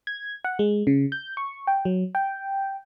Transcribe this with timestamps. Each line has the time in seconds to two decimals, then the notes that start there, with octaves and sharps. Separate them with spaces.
0.07 G#6
0.44 F#5
0.59 G#3
0.87 C#3
1.12 G6
1.37 C#6
1.67 G5
1.85 F#3
2.15 G5